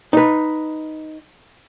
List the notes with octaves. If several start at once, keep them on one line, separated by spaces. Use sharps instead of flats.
D#4 B4